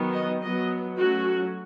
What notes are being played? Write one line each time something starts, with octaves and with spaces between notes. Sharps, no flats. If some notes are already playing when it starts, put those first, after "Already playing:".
Already playing: D#3 F#3 B3
D#5
F#3 B3 D#5
F#3 A3 C#4 F#4